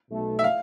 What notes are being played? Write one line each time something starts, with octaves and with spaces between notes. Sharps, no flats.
B1 B2 A3
E5
F5